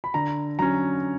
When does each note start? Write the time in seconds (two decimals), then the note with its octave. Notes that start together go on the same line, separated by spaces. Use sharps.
0.04 B5
0.14 D3 A#5
0.59 F#3 C#4 A#5